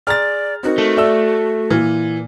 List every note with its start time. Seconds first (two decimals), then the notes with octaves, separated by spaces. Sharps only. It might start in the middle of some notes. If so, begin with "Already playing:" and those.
0.07 G#4 D5 A#5 C6 F6 A6
0.63 C4 D#4 F#4 A#4
0.78 A3
0.97 A4 D5 E5 E6
1.70 A#2 E3 F6